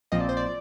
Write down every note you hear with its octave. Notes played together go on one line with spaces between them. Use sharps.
A#1 A#2 F3 C4 D#5
D5
C5
D5